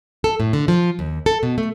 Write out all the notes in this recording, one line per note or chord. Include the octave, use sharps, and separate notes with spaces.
A4
A2
D3
F3
D#2
A4
B2
A3